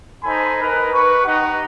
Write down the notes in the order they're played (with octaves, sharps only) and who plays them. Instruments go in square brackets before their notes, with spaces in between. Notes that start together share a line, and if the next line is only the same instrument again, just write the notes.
[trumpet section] D#4 A4 C5 G#5 B5
D#4 A#4 B4
B4 C#6
D#4 G4 F#5